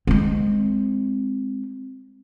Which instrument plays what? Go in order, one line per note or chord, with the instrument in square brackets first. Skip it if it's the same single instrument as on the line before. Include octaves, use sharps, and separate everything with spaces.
[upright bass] G#3 C4